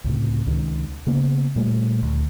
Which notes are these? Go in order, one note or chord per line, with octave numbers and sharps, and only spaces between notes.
C#2 A2 C3
C#2 C3 D#3
C#3 A#3 B3
A#2 G3 A3
D2